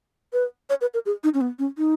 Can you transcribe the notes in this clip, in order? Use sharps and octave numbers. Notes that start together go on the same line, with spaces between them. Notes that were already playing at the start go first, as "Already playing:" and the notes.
B4
C#5
B4
A#4
G#4
D#4
C#4
B3
C#4
D#4